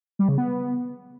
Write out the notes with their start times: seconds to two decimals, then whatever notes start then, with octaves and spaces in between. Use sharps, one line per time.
0.19 G3
0.29 C#3
0.38 B3